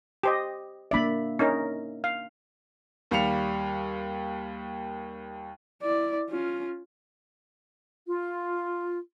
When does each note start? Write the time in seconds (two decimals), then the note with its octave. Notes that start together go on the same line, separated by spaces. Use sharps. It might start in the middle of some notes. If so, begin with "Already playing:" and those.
0.23 G4 C5 D#5
0.91 A#3 D4 D5 E5 B5
1.39 C#4 D#4 A#4
2.04 F5
3.11 D#2 G3 F5 C#7 F7
5.82 E4 D5
6.30 C#4 F4
8.07 F4